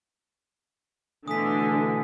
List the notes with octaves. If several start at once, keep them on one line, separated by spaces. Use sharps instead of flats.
B2 D3 E3 A3 G#5 D#6 B6